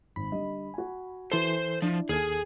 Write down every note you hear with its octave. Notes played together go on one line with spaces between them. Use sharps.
G#1 B5
D3 G3 D#5
F#4 G#5
E3 A4 C5 C6
F3 D4 E4
D#2 G#4 A4 F6 G#6 D#7